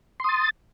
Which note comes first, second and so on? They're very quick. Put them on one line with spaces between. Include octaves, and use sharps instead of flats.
C6 D#6 A6